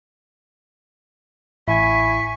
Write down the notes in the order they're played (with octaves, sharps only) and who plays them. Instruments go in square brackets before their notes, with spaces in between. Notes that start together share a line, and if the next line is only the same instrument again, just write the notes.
[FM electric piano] A1 [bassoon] E4 [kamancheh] G#5 C#6 [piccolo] B6